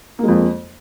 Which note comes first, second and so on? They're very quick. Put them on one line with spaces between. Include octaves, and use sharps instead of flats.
A#3 G#3 F2